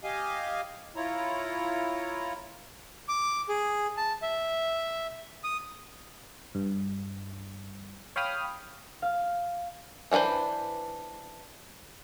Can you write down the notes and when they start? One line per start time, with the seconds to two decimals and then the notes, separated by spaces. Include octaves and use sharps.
0.04 G4 D#5 F5 G#5
0.96 E4 F4 C#5 A#5
3.09 D6
3.49 G#4
3.97 A5
4.22 E5
5.44 D#6
6.55 G2
8.16 C#5 F5 G5 B5 D#6 F6
9.02 F5
10.11 E3 D4 F4 B4 C5